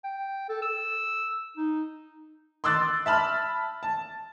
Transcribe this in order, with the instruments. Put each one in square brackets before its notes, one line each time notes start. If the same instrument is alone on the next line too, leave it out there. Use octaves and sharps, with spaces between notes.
[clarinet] G5
A4
E6
D#4
[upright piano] C6 D6 E6 F#6 A6
E5 A5 B5 F6
A5